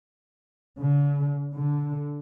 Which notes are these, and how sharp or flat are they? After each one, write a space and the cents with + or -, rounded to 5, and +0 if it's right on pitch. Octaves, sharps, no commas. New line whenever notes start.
D3 -45
D3 -10